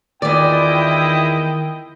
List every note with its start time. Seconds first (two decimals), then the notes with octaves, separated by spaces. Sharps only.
0.22 E2 D#3 E4 F4 D5 D#5 G5